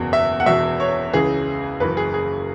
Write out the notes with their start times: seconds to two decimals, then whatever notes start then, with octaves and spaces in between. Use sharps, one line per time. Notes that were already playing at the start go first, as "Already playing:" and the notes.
Already playing: F#1 E2 B2
0.13 E5
0.40 F#5
0.46 E1 E2 B2 E5
0.80 C#5
1.13 C#2 C#3 E3 G#4
1.80 F#1 F#2 E3 B4
1.97 G#4
2.14 G#4